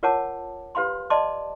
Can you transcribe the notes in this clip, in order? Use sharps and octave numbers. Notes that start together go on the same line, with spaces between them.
F4 A#4 C#5 F#5 A5 D6
G4 B4 F5 B5 C6
D5 D#5 A5 C6 D6